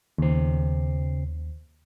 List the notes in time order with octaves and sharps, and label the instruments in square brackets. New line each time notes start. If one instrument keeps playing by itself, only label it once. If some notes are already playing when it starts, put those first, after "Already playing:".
[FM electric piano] D#2 [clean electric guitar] C#3 C5